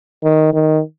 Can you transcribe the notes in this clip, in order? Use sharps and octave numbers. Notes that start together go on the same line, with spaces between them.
D#3
D#3